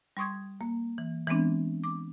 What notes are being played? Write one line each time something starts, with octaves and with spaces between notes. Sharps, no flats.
G3 C6 C#6 D#6 G#6
A#3
E3
E3 G#3 B3 C4 D4
D6